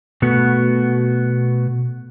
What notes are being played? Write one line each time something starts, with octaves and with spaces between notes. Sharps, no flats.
B2 A3 B3 F#4